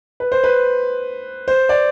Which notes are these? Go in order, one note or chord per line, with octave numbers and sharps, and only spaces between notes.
B4
C5
B4
C5
D5